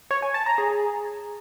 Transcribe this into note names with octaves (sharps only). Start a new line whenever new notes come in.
C#5
G#5
A5
A#5
G#4